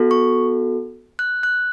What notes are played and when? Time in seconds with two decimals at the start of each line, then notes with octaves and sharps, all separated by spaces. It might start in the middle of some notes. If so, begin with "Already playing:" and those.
Already playing: B3 F#4 A4
0.11 C#6
1.19 F#6
1.43 F#6